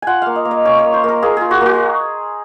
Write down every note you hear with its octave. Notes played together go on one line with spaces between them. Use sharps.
F4 F#5 G#5
A#3 F5
D#5
A#3
D#5
C#4 C#5
A#3 C#5
C5
A#3 A#4
A#3 G#4
F4 G#4
F#4
A#3 F#4